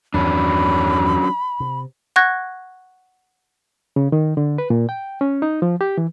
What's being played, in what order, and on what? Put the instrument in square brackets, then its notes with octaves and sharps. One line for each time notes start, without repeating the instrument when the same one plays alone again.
[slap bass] E2 G2 D#3 [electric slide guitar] F#3 C#4 D4 [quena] B5
[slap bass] C3
[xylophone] F#5 C#6 F#6 G#6 A#6
[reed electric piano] C#3
D#3
D3
B4
A#2
G5
C#4
D#4
F3
G4
E3